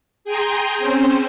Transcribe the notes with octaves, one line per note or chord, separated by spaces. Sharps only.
G#4 G5 G#5 A#5 C6
C4 C#4 C5